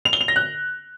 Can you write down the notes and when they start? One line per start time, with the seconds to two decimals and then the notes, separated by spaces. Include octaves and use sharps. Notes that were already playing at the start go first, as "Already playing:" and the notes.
0.05 F7
0.13 G7
0.21 F7
0.28 A#6
0.36 F#6